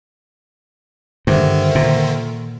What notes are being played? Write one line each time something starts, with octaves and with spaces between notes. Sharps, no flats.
G2 D3 D#3 C5 E5
A#2